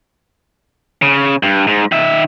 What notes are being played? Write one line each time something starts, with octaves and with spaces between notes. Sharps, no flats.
C#3
G2
G#2
D#3 E5